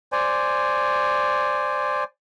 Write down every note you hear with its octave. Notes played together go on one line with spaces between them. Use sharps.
C5 D5 G#5